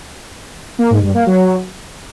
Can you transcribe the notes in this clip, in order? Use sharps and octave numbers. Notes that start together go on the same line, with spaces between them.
A#3
G#2
G2
A#3
F#3